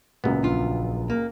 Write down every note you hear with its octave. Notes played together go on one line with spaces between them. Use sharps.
C#2 F#2 A#2 B3
A#1 D4 F4
A#3